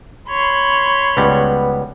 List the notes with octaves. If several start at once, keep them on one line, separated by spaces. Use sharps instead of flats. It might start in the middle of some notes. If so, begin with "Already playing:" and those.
C#5 B5 C6
C#2 G3 B3